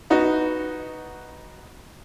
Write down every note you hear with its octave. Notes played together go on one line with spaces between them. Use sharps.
B3 D#4 F#4